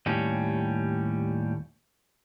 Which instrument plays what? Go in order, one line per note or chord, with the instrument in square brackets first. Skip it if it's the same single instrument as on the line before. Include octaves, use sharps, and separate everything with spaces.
[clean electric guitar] D#2 A2 G3 C#4